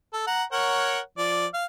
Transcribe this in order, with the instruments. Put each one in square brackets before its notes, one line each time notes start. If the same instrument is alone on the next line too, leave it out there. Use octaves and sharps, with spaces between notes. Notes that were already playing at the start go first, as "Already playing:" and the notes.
[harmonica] A4
F#5 A#5
A#4 C#5 F#5
F3 D5
F5